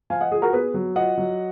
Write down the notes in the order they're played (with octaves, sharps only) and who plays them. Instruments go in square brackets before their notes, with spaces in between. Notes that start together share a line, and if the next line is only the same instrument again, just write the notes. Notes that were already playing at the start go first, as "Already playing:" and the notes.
[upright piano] F3 F5 G#5
D#5 F#5
F4 G#4
F#4 A#4
B3 G#4 B4
F#3
F4 D#5 F#5
F#3